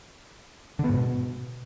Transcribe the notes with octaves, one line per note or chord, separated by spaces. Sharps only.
D3
B3
G#2
B2